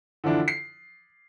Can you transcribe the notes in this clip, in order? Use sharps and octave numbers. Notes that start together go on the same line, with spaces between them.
D3 E3 F3 D4 E4
C7